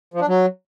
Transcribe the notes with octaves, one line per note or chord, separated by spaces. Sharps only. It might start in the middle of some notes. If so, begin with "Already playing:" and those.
F3
D4
F#3